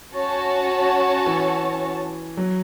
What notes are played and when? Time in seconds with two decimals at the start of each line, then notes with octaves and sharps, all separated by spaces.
0.15 C#4 F#4 C#5 A5
1.26 E3
2.37 F#3